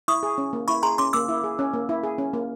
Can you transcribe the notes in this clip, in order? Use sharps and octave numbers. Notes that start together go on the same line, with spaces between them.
E4 C#6 D#6
G#4
C#4
A#3
E4 B5 C#6
G#4 A#5 C6
C#4 C6 D6
A#3 D6 E6
E4
G#4
C#4
A#3
E4
G#4
C#4
A#3